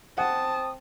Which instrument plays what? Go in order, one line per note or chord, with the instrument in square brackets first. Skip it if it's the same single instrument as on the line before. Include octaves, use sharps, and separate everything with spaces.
[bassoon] C4 [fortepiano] F#5 [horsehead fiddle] A5 [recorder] D#6